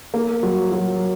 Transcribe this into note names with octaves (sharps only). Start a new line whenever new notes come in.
A#3
F#3
F#3